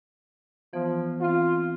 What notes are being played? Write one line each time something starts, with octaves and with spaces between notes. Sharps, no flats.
E3 F3 B3
E3 C4 F4